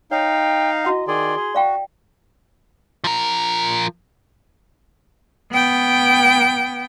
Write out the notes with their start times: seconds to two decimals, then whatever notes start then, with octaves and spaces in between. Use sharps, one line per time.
0.11 D#4 C#5 F5 G5
0.84 E4 F#4 D#5 F#5
1.08 D#3 G#4 D5 C6
1.36 G#4
1.55 F#4 D5 F5 G5
3.04 F3 A#4
5.52 B3 G5